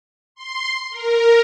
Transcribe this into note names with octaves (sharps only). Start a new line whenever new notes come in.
C6
A#4